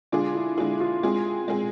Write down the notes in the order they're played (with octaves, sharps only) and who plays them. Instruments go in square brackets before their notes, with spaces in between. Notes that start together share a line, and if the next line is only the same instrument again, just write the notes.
[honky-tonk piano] D3 G#3 D4 G#4 [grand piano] F4
[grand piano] E4
[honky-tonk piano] D3 G#3 D4 G#4 [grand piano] F4
[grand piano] F4
[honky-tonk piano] G#3 C4 G#4 [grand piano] F4
[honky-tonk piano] G#3 C4 G#4